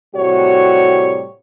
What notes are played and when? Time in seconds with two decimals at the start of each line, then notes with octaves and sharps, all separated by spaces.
0.15 A2 C3 G3 F#4 C#5